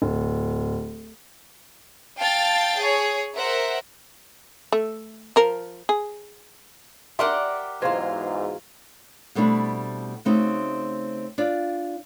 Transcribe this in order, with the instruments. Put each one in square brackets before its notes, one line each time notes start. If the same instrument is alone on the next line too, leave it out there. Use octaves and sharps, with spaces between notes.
[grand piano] D1
[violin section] F5 G5 A5 A6
G#4 C#5
A#4 C5 E5 F#5
[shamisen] A3
F3 A#4
G#4
[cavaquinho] G4 A#4 F#5 [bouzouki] D5 [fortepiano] E5 C6 D6
[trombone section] E2 G#2 [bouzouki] F#3 G#3 F4 [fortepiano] C5 F5 C6
[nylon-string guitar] B2 G3 A3 C4 D4 E4
C#3 A3 C4 D#4 F#4
D4 F4 D5